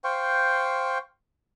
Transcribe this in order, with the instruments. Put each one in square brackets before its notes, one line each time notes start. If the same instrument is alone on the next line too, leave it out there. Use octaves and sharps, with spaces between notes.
[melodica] C5 F5 G5 C#6